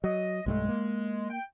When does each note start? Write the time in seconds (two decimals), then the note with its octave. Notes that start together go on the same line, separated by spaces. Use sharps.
0.04 F#3 D#5
0.46 B1 G2 G#3 A3
0.69 A#3
1.30 G5